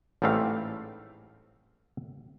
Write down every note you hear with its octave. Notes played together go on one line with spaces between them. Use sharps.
A1 G#2 G3 A3 C4 F5